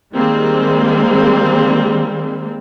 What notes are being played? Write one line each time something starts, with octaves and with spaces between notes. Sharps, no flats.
D#3 G3 G#3 A#3 C4